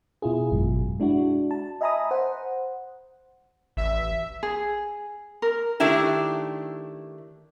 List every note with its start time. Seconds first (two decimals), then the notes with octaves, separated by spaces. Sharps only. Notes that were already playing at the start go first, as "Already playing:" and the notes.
0.22 B2 E4 F4 G#4
0.51 G#1 F#2 B2 G#3
1.00 G#3 D4 E4 F#4
1.51 A5
1.81 D#5 E5 G#5 A#5 B5 D#6
2.11 C5 F#5
3.77 A1 E5
4.43 G#4
5.42 A#4
5.80 D#3 A3 D4 E4 G4